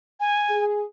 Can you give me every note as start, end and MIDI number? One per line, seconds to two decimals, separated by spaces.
0.20 0.64 80
0.49 0.83 68